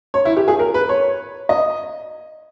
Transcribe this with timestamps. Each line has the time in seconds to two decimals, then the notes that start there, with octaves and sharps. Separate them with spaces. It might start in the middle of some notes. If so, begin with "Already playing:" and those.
0.14 C#5
0.25 E4
0.37 G4
0.48 G#4
0.59 A#4
0.74 B4
0.89 C#5
1.49 D#5